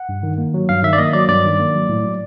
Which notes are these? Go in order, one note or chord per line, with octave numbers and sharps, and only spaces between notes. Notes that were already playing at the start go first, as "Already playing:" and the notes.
Already playing: F#5
G2
D#3
A#3
F#3
G2 F5
D#3 E5
D5
A#3 D#5
F#3 D5
G2 D5
D#3
A#3
F#3
A2
F#3